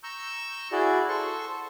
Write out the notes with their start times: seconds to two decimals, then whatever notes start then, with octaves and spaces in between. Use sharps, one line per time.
0.03 A#5 C#6 E6 G6
0.72 E4 F#4 G#4 D5
1.08 A4 C5 C6 C#6